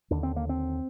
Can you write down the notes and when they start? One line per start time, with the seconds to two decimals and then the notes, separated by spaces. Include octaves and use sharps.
0.11 D#2 D3 D4
0.23 C4
0.36 A#3
0.49 C4